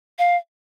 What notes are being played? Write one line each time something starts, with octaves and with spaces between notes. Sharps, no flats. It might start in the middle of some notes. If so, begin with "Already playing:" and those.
F5